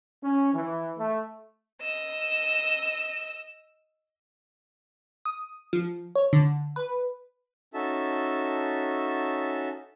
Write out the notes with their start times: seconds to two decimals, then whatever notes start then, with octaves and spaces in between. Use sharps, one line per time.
0.24 C#4
0.54 E3
0.98 A3
1.82 D#5 E6
5.25 D#6
5.73 F3
6.16 C#5
6.33 D3
6.76 B4
7.74 C#4 D#4 F#4 A4 E5 A5